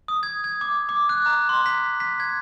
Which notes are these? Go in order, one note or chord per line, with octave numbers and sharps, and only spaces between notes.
D#6
G#6
G#6
D6
D6
F#6
A#5
C6
B6
B6
G#6